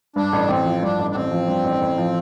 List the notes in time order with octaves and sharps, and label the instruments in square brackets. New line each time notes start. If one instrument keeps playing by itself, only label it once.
[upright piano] G2 [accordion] D4
[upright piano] A1
[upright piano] A1 [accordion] C4
[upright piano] F3
[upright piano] G2 [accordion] D4
[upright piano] A1
[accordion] D4
[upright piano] A1 [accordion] C4
[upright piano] F3
G2
A1
A1
F3